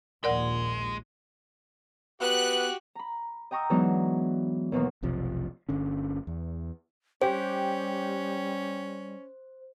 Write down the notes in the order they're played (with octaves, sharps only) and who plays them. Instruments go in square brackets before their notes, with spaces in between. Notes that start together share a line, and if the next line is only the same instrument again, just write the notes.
[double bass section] A#1 D#2 A#2 [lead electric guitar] G#3 [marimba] A#4 D5 F#5
[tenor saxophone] B3 [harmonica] F#4 G4 [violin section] F#6
[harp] A#5 B5
D#5 G5 A#5 C#6 D#6 E6
E3 F#3 G#3 B3 D4 D#4
D#2 B2 E3 A#3
[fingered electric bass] F1 B1 C3 F3
G1 D3 C#4
E2
[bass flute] G3 [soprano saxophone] C#4 [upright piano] G4 [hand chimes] C5